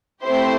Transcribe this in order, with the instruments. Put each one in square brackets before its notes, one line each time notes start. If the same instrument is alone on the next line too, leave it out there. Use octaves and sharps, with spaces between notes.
[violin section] A3 C4 E4 G4 C5